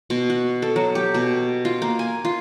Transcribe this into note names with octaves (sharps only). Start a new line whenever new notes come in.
B2
F#4
A4
F#3
G4
B2
F4
A#3
G#5
F4